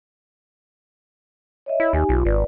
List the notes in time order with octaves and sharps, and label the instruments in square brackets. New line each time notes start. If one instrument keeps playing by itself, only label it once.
[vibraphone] C#5 D#5 E5
[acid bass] E4
[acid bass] D#2 [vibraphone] D#4 G4 G#5
[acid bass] B1 [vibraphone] F4
[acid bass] G#1 [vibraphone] B4 D5